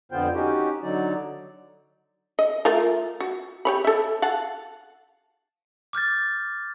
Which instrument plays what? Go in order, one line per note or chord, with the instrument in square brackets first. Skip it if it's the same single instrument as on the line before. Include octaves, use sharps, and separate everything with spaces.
[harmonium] F2 D3 B3 F4 C5 G5
C#4 D#4 F#4 G4
D3 F#3 D#4 D5
[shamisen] D#5
A3 F4 A#4
F#4
G4 C#5 B5
A4 E5
F5 F#5 A5
[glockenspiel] D6 F6 G6 A6